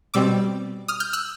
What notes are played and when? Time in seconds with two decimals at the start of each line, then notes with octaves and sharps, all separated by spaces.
0.14 B2 G3 C4 D6 E6
0.88 D#6 F6
1.00 F6 G6
1.13 E6 F#6